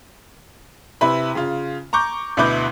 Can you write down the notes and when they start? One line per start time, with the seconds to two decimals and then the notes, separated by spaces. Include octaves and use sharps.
1.01 C3 E4 B4 B5
1.35 C#3 F4
1.93 A#5 C#6 D6 G6
2.37 D2 B2 E4 B4 D6 G6